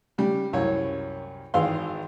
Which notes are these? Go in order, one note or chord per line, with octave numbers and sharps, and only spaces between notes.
C#3 G3
C2 F#2 C#5
G#1 E3 G#3 F5 C6